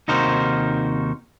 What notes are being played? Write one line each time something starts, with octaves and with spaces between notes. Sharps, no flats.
D#2 C3 D#4 F#4 A#4 C5